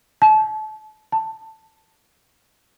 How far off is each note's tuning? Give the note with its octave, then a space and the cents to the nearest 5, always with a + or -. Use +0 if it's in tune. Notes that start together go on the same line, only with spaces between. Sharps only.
A5 -30
A5 +10